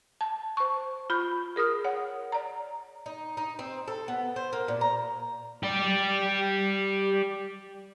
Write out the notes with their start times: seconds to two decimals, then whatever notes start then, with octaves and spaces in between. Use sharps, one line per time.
0.21 A5
0.57 C5 C#6
1.10 F4 B5 G6
1.56 G#4 A#4 D#6 F6
1.85 C#5 F#5
2.32 D5 A#5
3.06 D#4
3.37 D#4
3.59 C4
3.88 A4
4.08 B3
4.36 C5
4.53 A#3
4.68 A#2
4.81 A#5
5.63 G4 D5